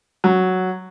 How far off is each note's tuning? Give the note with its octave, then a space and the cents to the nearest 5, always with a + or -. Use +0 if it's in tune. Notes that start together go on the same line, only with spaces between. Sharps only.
F#3 +0